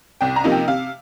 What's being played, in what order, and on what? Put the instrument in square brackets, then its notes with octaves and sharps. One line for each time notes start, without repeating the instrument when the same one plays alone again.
[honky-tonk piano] C2 G5
A#5
C3 F3 A#3 D#4
G5
C3 F5